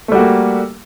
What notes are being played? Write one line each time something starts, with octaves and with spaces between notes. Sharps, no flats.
G3 A3 A#3 F#4